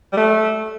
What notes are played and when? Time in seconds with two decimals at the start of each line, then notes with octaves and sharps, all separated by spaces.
0.13 G3
0.17 A3